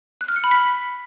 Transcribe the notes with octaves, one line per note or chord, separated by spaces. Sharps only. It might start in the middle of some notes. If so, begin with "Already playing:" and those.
F#6
F6
C#7
B5
B6